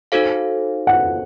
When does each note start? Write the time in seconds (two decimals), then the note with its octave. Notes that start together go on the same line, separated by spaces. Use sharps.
0.12 D#4 F#4 A4 C5 F5
0.87 F#5